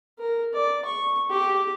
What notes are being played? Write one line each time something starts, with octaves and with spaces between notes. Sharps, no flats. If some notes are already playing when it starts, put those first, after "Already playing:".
A#4
D5
C#6
G4